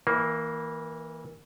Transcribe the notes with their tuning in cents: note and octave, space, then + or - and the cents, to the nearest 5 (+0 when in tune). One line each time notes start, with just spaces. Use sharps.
E3 -25 A#3 +0